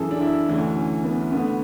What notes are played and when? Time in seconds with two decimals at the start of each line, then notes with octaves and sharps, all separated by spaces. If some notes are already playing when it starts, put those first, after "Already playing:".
Already playing: F#2 C#3 E3 G#4 A4
0.11 D4
0.21 E4
0.49 D2 C#3 E3 C#4
0.77 C#4
1.04 B3
1.32 D2 D3 B3